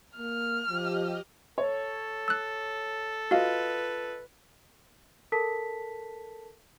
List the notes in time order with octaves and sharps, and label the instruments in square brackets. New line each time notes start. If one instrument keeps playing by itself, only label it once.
[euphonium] A#3 [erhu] F6
[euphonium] F3 [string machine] G4 D#5
[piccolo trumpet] A4 [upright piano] C#5
[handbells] E6 F#6
[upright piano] F4 D#5 [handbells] F#4 F5 [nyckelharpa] B4
[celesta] A4 A#4 A5 B6